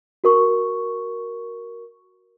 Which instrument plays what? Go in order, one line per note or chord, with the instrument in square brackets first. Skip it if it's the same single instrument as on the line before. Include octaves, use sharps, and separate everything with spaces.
[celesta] F#4 A#4 C#6